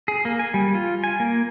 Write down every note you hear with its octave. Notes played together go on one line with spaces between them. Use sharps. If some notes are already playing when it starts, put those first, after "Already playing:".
G#4
A#3
G#5
G3
F4
G#5
A#3